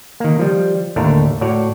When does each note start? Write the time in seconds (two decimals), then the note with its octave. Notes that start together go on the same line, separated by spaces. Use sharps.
0.20 D#3 A#3
0.39 F3 G3
0.96 D#2 A2 D3 A3 A#4
1.41 A2 F#4 C#5 D5